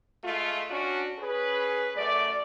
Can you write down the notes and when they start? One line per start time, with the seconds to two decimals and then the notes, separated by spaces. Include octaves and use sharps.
0.24 G#3 A3 F4
0.70 C#4 D4 F#4
1.19 C#4 G#4 B4
1.96 F#2 A3 D5